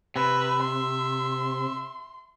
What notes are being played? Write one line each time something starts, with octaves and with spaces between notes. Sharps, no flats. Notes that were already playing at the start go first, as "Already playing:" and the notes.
C3 B4 E5
C6